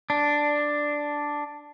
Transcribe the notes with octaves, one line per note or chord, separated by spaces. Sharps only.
D4